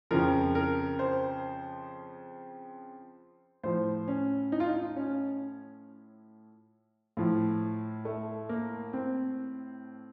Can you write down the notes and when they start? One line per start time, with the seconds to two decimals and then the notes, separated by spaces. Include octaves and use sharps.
0.11 F2 C#3 F3 A#4
0.55 A#4
0.99 C5
3.63 A2 F3 C5
4.08 C#4
4.52 D#4
4.60 F4
4.69 D#4
4.96 C#4
7.17 A2 F3
8.05 A3
8.49 A#3
8.93 C4